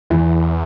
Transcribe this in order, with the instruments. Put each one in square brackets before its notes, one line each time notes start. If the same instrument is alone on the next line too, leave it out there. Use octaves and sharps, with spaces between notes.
[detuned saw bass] E2 [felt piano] E3